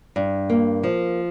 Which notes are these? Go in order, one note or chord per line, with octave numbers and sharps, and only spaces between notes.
G2
A#3
F3